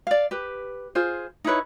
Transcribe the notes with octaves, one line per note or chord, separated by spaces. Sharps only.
D5 F5
G4 B4
F4 G#4 C5
D#4 E4 B4 C#5